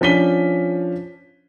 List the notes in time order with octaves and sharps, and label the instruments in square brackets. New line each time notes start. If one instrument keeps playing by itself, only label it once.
[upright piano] F3 C#4 D4 B6 D#7 G7